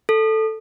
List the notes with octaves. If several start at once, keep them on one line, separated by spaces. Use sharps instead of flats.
A4